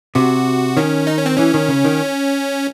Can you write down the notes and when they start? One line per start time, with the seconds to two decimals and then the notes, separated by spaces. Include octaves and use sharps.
0.15 C3 F#4
0.77 D#3 C#4
1.07 D#4
1.17 C#4
1.26 C4
1.36 E3 C#4
1.54 D#3
1.68 C#3
1.85 D#3